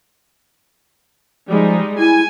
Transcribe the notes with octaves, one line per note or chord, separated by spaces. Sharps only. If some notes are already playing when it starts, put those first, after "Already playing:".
F3 G3 G#3 D#4
E4 G#5